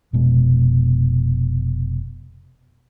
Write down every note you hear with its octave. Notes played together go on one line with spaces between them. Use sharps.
F1 B2 G#3